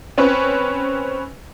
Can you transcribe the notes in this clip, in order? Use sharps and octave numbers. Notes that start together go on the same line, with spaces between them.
C4 C#4 B4